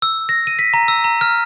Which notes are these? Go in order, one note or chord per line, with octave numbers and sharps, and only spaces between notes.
E6
A#6
D#7
B6
A#5
E6
A#5
F6